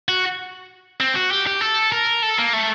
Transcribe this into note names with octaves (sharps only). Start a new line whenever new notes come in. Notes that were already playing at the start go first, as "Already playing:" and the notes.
F#4
C4
F#4
G4
G4
A4
A#4
A4
A#3
A3